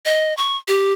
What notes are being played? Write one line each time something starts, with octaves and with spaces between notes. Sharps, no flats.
D#5
C#6
G4